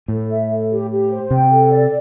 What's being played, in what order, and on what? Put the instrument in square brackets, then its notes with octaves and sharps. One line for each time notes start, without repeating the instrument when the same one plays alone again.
[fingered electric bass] A2 [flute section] A4
[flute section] E5
A4
G4
G4
C5
[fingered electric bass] C3 [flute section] G5
[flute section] A4
D5